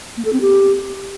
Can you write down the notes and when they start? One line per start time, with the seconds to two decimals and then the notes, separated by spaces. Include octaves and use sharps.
0.17 A#3
0.25 A4
0.33 C4
0.41 G4